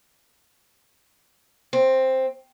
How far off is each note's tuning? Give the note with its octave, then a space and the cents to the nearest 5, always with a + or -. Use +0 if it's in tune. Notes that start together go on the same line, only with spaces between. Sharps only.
C4 +5